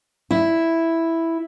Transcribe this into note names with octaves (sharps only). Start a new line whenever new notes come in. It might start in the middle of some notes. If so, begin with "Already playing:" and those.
E4